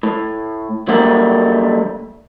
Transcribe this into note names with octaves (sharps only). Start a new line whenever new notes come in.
A2
D3 F#3 G3 A3 A#3 F#5